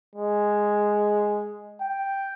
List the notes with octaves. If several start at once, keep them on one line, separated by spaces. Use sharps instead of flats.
G#3
G5